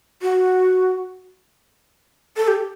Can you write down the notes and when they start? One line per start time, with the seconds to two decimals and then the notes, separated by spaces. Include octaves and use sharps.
0.22 F#4
2.37 A4
2.48 G4